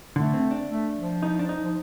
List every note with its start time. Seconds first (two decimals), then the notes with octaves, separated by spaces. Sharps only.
0.16 D3 A3
0.34 C4
0.51 D4
0.69 A3
0.96 F3
1.23 D#4
1.39 D4
1.49 D#4
1.64 F3